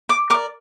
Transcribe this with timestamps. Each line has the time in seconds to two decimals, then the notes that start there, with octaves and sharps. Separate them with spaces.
0.09 D6
0.30 A#4 D6
0.34 D5